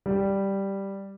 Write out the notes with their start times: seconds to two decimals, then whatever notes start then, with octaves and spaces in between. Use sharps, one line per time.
0.06 G3